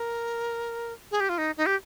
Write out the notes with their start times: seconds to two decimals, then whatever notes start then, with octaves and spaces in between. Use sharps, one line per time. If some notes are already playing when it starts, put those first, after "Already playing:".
Already playing: A#4
1.11 G#4
1.20 G4
1.29 F4
1.38 D#4
1.57 D#4
1.66 G4